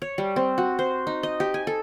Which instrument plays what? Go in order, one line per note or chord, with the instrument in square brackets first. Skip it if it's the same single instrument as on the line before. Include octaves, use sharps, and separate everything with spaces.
[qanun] C#5
G3
C4
F#4
C5
D#4
D#5
G4
G#5
A4